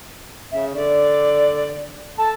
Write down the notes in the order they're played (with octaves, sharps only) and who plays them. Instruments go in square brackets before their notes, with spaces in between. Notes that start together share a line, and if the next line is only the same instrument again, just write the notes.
[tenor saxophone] C#3 [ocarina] E5
[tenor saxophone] D3 [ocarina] D5
[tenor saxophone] A4 [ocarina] A5